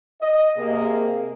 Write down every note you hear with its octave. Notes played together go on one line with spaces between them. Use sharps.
D#5
C3 A#3 G#4